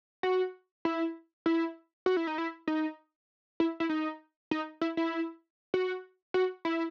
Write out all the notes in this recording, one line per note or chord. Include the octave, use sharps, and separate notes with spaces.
F#4
E4
E4
F#4
E4
D#4
E4
D#4
E4
E4
D#4
D#4
E4
E4
F#4
F#4
E4